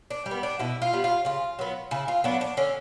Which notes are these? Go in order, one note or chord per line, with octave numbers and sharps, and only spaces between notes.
D4
G3
B3
D4
B2 E4
F4
G3 B3
F4
C#3 F4
F#3 B3
C#3 E4
F4
F#3 B3 D4
D4
D3 C#4